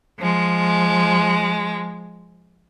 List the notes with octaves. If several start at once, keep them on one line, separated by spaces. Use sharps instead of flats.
F3 G#3